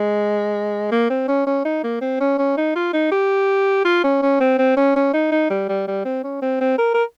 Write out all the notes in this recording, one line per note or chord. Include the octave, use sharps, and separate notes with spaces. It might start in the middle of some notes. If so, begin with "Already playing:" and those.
Already playing: G#3
A#3
C4
C#4
C#4
D#4
A#3
C4
C#4
C#4
D#4
F4
D#4
G4
F4
C#4
C#4
C4
C4
C#4
C#4
D#4
D#4
G3
G3
G3
C4
C#4
C4
C4
A#4
A#4